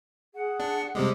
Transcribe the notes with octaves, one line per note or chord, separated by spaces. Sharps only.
G#4 F#5
D4
C3 G3 G#3 C5 D6